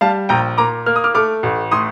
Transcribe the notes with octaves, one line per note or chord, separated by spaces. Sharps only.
G3 F5 A5
A#1 G5 A#5
A#2 A#5 D6
A#3 F6
D#6
D6 F6
A3 D6 F6
A1
A2 C6 D#6